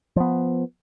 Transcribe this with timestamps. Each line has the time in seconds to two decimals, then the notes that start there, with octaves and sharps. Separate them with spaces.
0.16 F3 B3